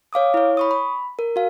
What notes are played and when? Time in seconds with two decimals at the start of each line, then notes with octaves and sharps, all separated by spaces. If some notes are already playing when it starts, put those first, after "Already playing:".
0.13 C#5 F5 D6 D#6
0.34 E4 C#5
0.57 B5 C#6 D#6
0.71 B5
1.19 A#4
1.36 F#4 F5